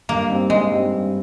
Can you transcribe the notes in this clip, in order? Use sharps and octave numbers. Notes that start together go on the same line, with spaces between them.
G2 A#3
G3 C4 D#4
G2 G#3
G3 C4 D#4
G2